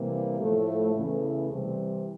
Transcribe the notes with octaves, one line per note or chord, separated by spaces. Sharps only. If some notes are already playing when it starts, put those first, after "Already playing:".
Already playing: C3 E3 G3 A#3
A2 F3 A3
E2 C#3 E3 A3
C3 E3 G3 C4